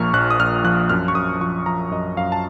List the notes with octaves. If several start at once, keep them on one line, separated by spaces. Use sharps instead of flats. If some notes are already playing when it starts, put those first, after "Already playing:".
Already playing: A#1 A#2 F3 A#5 C#6 F6
A#1 F#6
D#6
A#1 F6
F3 F#6
F#2 F6
C#6
F#2 D#6
F3 C#6
F3 A#5
F#2 D#5
F#2 F5
A5